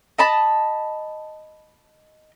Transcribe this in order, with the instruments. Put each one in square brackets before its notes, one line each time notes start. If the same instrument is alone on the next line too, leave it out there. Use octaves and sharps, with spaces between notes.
[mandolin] D#5 A5 B5